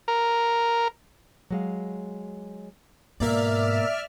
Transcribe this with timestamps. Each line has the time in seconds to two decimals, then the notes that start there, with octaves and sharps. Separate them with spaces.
0.08 A#4
1.51 F#3 G#3 F5
3.20 G#2 B2 A#3 A#4 D5 E5 F6